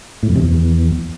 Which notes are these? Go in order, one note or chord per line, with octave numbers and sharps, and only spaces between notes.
A2
F2
C3
E2